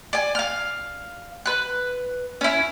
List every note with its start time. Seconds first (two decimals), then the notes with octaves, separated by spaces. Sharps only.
0.13 D5 G#5
0.35 F5 F6
1.46 B4 F#6
2.41 C#4 E4